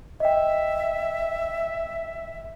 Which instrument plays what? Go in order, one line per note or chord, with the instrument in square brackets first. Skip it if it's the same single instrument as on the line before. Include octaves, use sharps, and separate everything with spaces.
[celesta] D#5 G5 [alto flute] E5